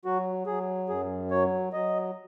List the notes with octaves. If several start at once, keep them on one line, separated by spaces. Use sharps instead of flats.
F#3 F#4
F#3 G#4
F#2 G#4
F#3 C#5
F#3 D#5